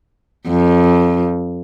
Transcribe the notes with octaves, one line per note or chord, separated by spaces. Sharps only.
F2